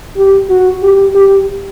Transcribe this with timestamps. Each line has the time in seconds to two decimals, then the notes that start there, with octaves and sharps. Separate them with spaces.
0.17 G4
0.50 F#4
0.83 G4
1.14 G4